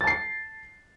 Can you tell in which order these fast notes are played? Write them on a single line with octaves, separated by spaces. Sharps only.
A6 A5 C7